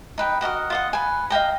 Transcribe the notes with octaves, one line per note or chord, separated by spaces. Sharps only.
D#4 B4 G5
F#4 A#4 D#5 F#5
F4 D#5 F#5
B4 G#5
D#5 F5 G5 A#5